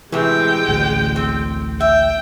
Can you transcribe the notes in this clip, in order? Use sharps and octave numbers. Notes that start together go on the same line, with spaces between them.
A2 C3 E3 G#3 G#4 G5
A1 D2
C4
E5 G5